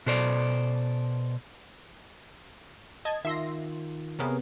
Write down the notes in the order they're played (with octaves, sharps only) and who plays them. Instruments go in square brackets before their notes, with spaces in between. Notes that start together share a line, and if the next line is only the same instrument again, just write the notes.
[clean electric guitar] B2 A4 C5 D5
[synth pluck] D#5 A5 G#6
[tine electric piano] D#3 F4 [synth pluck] E5 C6 A#6
[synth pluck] C3 B3 [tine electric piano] G#4 A#4 C#5